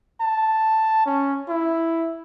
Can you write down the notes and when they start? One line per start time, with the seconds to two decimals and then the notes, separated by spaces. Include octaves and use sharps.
0.21 A5
1.06 C#4
1.49 E4